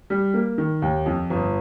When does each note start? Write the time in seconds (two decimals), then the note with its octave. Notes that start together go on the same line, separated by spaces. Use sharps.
0.10 G3
0.34 A#3
0.58 D#3
0.82 D#2
1.06 F2
1.30 G1